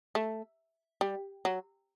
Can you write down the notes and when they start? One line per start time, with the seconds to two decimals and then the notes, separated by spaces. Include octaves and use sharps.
0.15 A3
1.01 G3
1.45 F#3